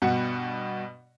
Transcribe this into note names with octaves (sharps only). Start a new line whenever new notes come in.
G2 B2 F#4 F#5 C#7